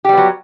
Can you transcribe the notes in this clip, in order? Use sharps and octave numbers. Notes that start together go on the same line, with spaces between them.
F#3 G3 B3 G4